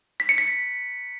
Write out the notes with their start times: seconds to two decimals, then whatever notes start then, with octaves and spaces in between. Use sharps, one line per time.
0.20 B6
0.29 C#7
0.38 B6